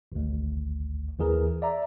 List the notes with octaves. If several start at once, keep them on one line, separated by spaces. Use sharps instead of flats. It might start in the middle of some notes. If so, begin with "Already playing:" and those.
G#1 D2
D#2 E3 G#4 A#4
D5 E5 A#5